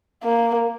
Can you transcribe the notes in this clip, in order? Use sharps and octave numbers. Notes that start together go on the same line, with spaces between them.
A#3